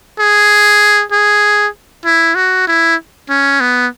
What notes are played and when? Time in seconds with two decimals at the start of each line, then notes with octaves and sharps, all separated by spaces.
0.19 G#4
1.12 G#4
2.05 E4
2.35 F#4
2.67 E4
3.29 C#4
3.60 B3